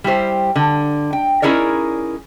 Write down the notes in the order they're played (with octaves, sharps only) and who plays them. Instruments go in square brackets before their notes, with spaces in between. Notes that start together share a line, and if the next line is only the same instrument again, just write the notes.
[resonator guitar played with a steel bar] G3 E4 G4 C5
D3
G5
C#4 D#4 E4 G#4 A#4 D5